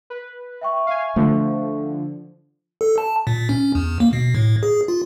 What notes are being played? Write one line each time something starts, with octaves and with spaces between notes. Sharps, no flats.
B4
E5 G5 C#6
F5 G#5
D3 F3 A3
A4
A5
A#2
C#4
E2
A#3
B2
A2
G#4
F4